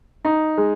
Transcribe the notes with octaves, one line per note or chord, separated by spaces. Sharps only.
D#4
G#3